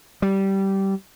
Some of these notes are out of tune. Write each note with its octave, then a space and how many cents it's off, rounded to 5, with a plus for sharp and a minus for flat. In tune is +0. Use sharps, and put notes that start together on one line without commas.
G3 -15